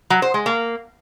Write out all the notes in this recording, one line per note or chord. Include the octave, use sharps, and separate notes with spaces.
F#3
C5
G#3
A#3